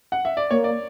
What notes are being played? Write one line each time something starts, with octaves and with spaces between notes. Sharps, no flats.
F#5
E5
D5
A#3 C#5
D5